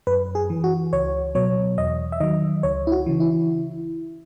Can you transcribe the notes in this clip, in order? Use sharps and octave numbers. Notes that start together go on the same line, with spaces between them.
F#2 B4
G#4
E3
F#4
C#2 C#5
B2 F#3 C#5
E2 D#5
E5
D#3 F#3 D#5
C#2 C#5
E4
F#4
C#3 E3
E4